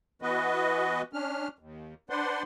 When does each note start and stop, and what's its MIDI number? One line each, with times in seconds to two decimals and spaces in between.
0.22 1.02 52
0.22 1.02 59
0.22 1.02 66
0.22 1.02 71
0.22 1.02 75
1.13 1.48 61
1.13 1.48 62
1.13 1.48 89
1.59 1.94 39
2.10 2.43 62
2.10 2.43 71
2.10 2.43 72
2.10 2.43 74
2.10 2.43 78
2.10 2.43 84